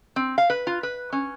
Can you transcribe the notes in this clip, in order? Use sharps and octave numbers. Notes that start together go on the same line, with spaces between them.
C4
F5
B4
F4
B4
C#4